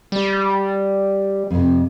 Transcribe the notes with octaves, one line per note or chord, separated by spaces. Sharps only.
G3
F2 C3